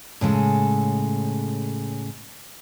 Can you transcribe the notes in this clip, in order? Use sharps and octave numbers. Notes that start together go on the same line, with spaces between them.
A2 C#3 G#3 A4